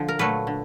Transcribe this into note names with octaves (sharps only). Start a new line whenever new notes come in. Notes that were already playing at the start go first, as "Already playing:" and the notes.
Already playing: D3 F3
A#4
A#2 F#3 A3 B4
D3